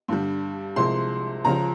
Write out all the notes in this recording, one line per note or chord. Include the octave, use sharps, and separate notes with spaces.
G2 D3 G3
C2 C3 F3 G#3 C6
C#2 C#3 F3 A#5